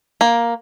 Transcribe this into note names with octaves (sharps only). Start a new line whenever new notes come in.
A#3